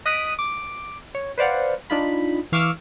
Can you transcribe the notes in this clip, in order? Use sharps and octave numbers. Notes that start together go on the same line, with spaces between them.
D#5 D#6 F#6 B6 D7 D#7
D6
C#5
B4 C5 D5 F5 F#5
D4 D#4 F4 B5
E3 F5 C#6 D6 E6 F6